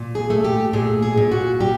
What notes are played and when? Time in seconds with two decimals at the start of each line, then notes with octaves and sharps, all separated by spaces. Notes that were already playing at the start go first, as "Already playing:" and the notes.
Already playing: A#2
0.15 G#4
0.30 A3
0.44 G4
0.73 A#2 G#4
1.02 G#4
1.17 A#2
1.31 F#4
1.60 G3 G4